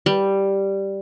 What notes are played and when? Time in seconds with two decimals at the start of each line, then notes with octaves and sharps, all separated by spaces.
0.06 G3